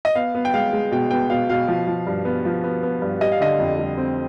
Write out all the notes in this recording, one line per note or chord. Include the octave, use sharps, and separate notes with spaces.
D#5
B3 F5
B3
G5
G#3 F5
G#3
B2 G5
B3 G5
B2 F5
B2 F5
F3
F3
G2
B3
F3
B3
B3
G2
G3 D#5
F5
D3 D#5
F2
G3
C4